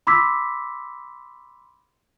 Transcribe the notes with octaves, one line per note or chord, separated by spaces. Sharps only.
B5 C6 D6 E6 B6